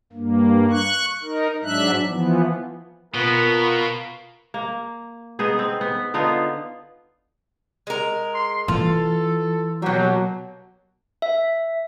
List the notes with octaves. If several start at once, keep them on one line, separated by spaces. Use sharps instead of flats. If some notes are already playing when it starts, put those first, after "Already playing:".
G2 A#3
C#6 F#6
D#4 A#4
G#2 F#3 D4 E5 F#6
E3 F3 B3
B2 B3 F4 A#4
A#3
B3 D#4 G#4
C4
B3
D3 B3 D#4 F4
G#3 A#4
C6
E3 F4 A4
B2 F#3 A#3 G4
E5